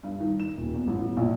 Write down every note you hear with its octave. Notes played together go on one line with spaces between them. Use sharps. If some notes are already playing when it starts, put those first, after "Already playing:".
G2
D#3
E7
D#1
E2
A1
B2
A#1